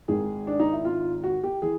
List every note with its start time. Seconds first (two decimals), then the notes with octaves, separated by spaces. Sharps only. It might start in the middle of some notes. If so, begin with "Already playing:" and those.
0.08 G#1 G#2 D#3 G#4
0.47 D4
0.60 D#4
0.72 E4
0.85 F4
1.23 F#4
1.43 G4
1.62 E3 G#4